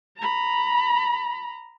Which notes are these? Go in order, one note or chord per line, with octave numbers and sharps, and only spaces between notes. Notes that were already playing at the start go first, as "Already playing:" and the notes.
A#5 B5